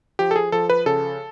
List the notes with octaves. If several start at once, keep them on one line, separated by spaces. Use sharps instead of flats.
F3 G4
A4
G#4
F3 A4
B4
C#3 A4